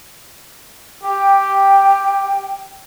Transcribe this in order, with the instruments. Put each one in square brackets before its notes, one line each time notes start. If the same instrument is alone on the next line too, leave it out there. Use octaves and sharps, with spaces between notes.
[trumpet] G4 [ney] G5